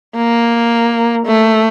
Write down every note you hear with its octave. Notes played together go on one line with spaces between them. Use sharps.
A#3
A3